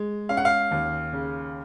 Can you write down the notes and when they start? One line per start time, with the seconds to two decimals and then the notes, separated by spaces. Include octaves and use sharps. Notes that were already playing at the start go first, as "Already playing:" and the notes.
Already playing: G#3
0.29 C#4 F5
0.37 F#5
0.45 F5
0.71 D#2
1.13 C#3